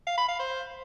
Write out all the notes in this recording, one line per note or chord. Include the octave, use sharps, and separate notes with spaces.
F5
B5
F5
C5